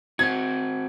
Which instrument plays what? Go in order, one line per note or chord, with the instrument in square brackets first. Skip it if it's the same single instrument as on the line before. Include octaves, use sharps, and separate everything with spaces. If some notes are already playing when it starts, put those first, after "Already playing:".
[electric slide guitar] C4 F#4 [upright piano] G#6